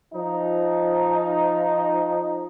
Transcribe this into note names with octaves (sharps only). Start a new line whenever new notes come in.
F3 D#4